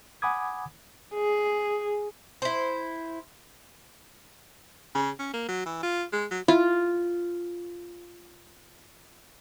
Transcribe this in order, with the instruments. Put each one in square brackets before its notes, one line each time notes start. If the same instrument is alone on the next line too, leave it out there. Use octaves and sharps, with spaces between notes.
[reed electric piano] F#5 G#5 B5 D6 D#6 G#6
[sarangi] G#4
[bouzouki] E4 C5
[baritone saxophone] C#3
C#4
A#3
F#3
E3
F4
G#3
F#3
[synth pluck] E4 [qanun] F4